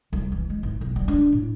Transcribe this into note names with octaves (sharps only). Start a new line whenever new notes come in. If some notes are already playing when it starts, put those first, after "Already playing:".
C2
E3
G#3
G#1
B1
G3
D4
A2